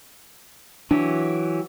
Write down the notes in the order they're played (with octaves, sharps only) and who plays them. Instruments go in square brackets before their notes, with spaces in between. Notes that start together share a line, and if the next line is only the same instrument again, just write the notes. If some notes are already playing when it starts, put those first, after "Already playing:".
[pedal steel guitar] E3 F#3 G4 [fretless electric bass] D4